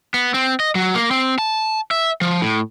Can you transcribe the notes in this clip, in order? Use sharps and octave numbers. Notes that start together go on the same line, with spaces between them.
B3
C4
D#5
F#3
A#3
C4
A5
E5
F3
A2